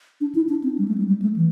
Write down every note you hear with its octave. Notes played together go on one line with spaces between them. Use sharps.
D4
E4
D4
C4
G3
A3
G3
G3
A3
E3